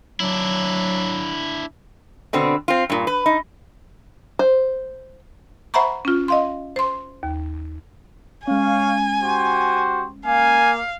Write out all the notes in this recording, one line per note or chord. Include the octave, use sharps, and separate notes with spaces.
F#3 D4 E4
B2 D3 C4
C4 F4
G2 A#2
B4
D#4
C5
C5 E5 F#5 A#5 B5 C#6
C#4 F4
D#5 F5 C6
C5 C6
D#2
G#3 C#4 C#5 F5 G#5
F#4 G4 C5
A#3 F5 G#5